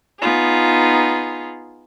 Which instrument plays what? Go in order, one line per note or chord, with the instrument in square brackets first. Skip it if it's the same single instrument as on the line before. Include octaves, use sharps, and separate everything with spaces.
[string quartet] B3 D#4 F4 G#4